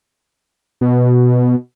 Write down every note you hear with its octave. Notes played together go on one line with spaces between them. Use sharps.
B2